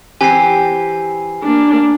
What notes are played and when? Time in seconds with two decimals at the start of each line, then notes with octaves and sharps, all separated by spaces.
0.21 E3 C4 G4 G#5 C7
1.43 A#3 D4